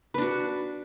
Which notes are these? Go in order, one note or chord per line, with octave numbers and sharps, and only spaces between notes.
D4 F#4 B4